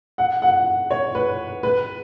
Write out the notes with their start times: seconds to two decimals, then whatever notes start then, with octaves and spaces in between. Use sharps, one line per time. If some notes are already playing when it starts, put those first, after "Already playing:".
0.18 F#5
0.42 F#5
0.91 C#5
1.15 B4
1.63 B4